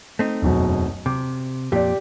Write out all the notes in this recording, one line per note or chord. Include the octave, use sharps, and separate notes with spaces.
A3 C4 D#4
E1 F#2 B2
C3 D6
F2 A#2 G4 D5